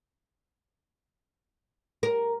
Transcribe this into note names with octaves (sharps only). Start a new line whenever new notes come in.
A#4